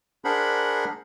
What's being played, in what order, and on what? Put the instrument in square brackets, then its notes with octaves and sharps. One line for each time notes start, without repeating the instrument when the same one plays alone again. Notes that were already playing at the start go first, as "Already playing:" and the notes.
[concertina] D4 G#4 A#4 C5 F#5 B5